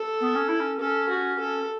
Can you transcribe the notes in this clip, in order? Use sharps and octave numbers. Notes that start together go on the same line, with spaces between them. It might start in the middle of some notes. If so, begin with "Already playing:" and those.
Already playing: A4
B3
C#4
E4
C#4
C#4 A4
F#4
A4